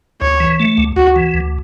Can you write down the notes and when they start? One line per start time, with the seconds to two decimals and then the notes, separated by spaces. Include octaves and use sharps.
0.22 D2 C#5
0.40 E3
0.60 A3
0.78 D2
0.96 D2 F#4
1.16 E3
1.34 D2